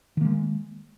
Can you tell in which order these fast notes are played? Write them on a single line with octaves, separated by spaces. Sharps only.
D#3 A#3 G#3